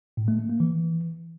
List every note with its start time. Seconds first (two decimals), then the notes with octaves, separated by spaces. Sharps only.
0.17 A2
0.28 A3
0.39 A#3
0.49 A#3
0.60 E3